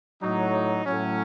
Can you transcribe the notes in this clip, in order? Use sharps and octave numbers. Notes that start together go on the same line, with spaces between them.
A2 F#3 D#4
A2 F#3 C#4